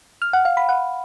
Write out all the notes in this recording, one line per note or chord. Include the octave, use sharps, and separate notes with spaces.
F6
F#5
F5
B5
F#5